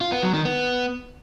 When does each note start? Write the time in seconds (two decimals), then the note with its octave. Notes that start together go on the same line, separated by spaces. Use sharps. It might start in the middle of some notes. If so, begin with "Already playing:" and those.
0.01 F4
0.12 B3
0.23 F#3
0.34 D#3
0.45 B3